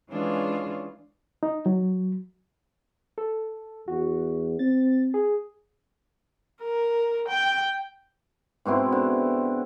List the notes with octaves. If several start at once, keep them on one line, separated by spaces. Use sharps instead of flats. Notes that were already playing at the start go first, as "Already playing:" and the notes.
E3 G#3 C#4 D4 F4
D#4
F#3
A4
E2 F#4
C4 A6
G#4
A#4
G5
G#2 B2 C4 E4
D3